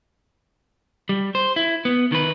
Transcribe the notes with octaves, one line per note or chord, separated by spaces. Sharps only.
G3
C5
E4
B3
D#3 B4